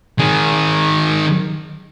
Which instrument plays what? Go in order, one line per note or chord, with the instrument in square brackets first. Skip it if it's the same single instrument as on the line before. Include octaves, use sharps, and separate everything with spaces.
[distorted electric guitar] D#3 G#4